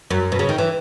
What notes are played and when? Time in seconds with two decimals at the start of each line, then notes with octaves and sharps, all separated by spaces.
0.11 F#2
0.32 B2
0.39 C#3
0.49 D#3
0.58 E3